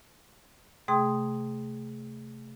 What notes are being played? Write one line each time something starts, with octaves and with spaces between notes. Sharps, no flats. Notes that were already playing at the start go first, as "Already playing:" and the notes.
C3 A3 G#4 G5 C6 D#6